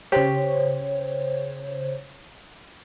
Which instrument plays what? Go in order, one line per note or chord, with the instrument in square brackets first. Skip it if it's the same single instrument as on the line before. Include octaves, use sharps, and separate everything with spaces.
[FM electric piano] C#3 C5 C#5 [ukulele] G4